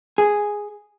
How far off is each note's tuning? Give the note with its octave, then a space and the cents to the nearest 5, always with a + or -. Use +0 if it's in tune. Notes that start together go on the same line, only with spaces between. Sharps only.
G#4 -5